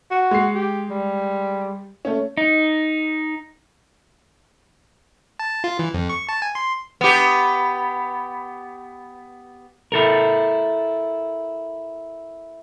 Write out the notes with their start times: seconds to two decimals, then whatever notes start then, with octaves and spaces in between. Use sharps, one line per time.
0.11 F#4
0.31 G#3 C7
0.55 G4
0.90 G3
2.05 A3 C#4
2.37 D#4
5.39 A5
5.64 F4
5.79 E3
5.94 F2
6.09 C#6
6.29 A5
6.42 G#5
6.55 C6
7.01 B3 G4
9.92 E4 A4 A#4